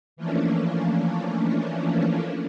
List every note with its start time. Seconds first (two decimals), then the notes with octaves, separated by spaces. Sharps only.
0.17 E3 F3 A3 A#3 C#4 D4